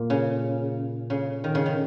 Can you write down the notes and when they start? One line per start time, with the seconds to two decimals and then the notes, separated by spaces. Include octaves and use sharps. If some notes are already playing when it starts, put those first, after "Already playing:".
Already playing: A#2
0.10 C#3
1.10 C#3
1.44 D#3
1.55 C#3
1.66 D#3